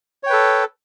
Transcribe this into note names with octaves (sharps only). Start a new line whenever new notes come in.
A4 B4 C#5 G5